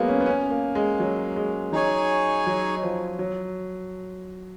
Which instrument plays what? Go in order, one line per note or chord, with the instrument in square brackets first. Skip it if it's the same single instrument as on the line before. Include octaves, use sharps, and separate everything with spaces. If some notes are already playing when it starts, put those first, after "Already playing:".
Already playing: [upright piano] F#3 G#3 A#3 B3
C#4
B3
C#4
A#3
G#3
F#3
G#3
[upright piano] F#3 [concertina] D#4 G#4 C#5 G#5
[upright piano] F#3
F3
F#3